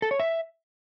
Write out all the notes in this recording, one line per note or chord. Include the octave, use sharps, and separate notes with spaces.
A4
C#5
E5